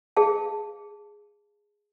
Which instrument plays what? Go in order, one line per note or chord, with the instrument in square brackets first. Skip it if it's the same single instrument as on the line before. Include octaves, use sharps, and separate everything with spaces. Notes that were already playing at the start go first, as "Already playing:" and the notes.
[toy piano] G#4 F5 A5